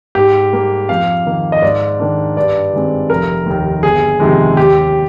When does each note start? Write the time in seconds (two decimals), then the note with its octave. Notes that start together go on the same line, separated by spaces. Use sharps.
0.15 G#2 G4
0.53 G3 A#3
0.89 F2 F5
1.26 D#3 A#3
1.52 D#5
1.62 G#2 D5
1.99 D#3 A#3 D4
2.37 G2 D5
2.73 D#3 G#3 C4
3.10 F1 A#4
3.46 D#2 D#3
3.83 G1 G#4
4.20 F2 C3 D#3 G#3
4.57 D#2 G4